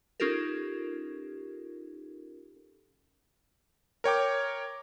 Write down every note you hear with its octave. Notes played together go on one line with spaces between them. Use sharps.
C#4 D#4 F4 G4 A4 A#4
A#4 C#5 G5 D6